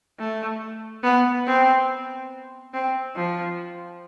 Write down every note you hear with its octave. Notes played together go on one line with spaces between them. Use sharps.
A3
B3
C4
C4
F3